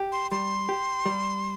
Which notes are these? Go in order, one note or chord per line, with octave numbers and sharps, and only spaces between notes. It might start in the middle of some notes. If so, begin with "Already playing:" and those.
Already playing: G4
C6
G3 C6
G4
G3